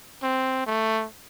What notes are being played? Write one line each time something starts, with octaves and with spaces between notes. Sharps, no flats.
C4
A3